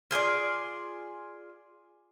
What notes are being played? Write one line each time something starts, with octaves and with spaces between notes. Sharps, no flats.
F4 G#4 C5 D5